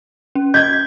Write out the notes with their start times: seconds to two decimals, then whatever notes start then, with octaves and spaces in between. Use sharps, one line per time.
0.35 C#4
0.54 D#5 G6 G#6 B6